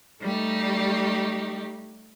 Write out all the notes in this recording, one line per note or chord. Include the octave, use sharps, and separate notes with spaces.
G3 A3 D#4 G4